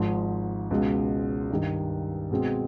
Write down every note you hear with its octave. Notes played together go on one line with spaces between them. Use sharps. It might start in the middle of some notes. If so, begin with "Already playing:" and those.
Already playing: G#1 G#2 F3
C#2 B2 G#3
G2 D#3 G3
B2 G#3 C4